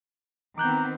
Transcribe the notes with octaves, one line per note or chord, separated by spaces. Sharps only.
D#3 B3 C4 A#5 D6 F#6 G6